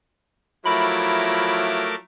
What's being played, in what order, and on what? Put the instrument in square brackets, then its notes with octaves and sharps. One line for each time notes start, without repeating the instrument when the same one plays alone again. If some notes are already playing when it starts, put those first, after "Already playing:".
[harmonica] F3 F#3 E4 [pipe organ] A3 A#4 D6 [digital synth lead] B5